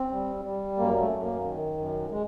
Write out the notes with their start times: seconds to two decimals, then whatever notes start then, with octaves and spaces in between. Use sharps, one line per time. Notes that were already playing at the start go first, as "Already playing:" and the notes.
Already playing: C4
0.12 G3
0.45 G3
0.78 F#2 A#3
1.00 A3
1.11 F#2
1.23 A#3
1.44 D#3
1.78 F#2
2.11 G#3